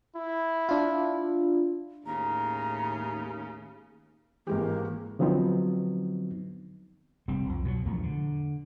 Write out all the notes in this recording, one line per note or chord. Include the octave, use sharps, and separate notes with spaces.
E4
D4 F4
D#2 A2 C#3 A#5
G#1 E3 G#3 A#3 G4
D3 F3 F#3 B3 C4 D#4
F1 G3 C4
C2 F2
B2 D3 F#3
A#1 E2 F3 A3
D3